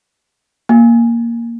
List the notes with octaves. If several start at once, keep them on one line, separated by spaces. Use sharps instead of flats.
A#3